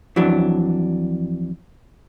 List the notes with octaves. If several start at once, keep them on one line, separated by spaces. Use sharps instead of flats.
F2 E3 F#3 D4